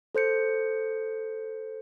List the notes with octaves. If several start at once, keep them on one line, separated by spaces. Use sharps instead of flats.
A4 C5 G6 C#7